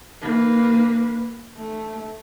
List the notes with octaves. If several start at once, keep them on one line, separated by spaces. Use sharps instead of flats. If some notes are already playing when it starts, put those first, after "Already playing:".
A#3 B4
A3